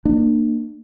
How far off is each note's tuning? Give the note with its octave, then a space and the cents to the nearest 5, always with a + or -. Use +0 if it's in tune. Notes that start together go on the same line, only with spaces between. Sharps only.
A#3 -10 D4 +35